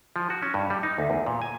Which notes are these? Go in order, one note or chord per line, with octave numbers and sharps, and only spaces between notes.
F3
F#4
C#4
G2
G3
D#4
D2
E2
A#2
G#5